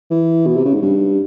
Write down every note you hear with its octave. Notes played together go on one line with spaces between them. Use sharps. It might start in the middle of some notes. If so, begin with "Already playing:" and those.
E3
B2
C3
C#3
G#2
G2